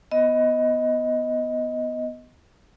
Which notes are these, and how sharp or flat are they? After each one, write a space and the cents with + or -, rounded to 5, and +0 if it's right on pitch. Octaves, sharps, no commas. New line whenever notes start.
B3 +0 D#5 +10